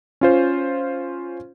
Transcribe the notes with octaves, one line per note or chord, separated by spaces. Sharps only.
C#4 F4 C5